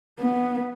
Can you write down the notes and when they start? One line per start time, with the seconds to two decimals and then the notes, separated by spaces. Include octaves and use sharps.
0.19 B3